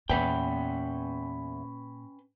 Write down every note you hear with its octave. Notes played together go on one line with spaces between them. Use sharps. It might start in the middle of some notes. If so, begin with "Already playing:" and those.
E2 A#2 C#4 B4 G5